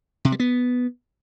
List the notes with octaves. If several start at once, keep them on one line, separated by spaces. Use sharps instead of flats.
C3
G3
B3